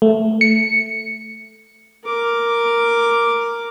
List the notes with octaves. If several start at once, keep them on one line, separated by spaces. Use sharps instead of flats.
A3
C#7
A#4 D6